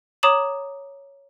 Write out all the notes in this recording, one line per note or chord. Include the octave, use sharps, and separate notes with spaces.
C#5 A#5 D6 D#6 E7 F#7